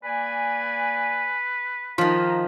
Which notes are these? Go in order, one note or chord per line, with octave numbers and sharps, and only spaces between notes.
A#3 B4 D5 G#5
D#3 F3 F4 D#5 F5 A#5